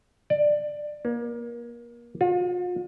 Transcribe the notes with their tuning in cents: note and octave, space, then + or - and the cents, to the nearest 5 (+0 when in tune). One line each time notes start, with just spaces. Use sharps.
D5 +15
A#3 +30
F4 +40